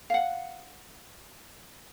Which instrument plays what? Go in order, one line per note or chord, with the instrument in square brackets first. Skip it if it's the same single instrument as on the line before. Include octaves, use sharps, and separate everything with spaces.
[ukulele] F5 F#5